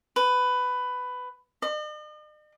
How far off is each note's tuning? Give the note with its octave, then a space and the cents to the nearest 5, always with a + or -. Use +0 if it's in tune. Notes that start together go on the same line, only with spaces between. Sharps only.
B4 +15
D#5 -45